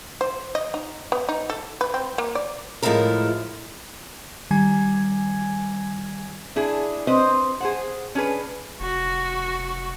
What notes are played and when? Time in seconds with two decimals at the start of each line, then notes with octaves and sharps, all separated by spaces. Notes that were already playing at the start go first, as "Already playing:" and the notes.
0.21 C5
0.55 D#5
0.74 D#4
1.12 B3
1.29 D#4
1.50 A4
1.81 B4
1.94 C4
2.18 A#3
2.35 D5
2.82 A2 F3 G#3 A3 E4 A#4
4.51 D#3 G3 G#5 G#6
6.56 D4 E4 G#4
7.07 C4 B4 C5 D#5
7.60 G#4 C5 F#5
8.15 C#4 D4 G#4 B4
8.80 F1 F#4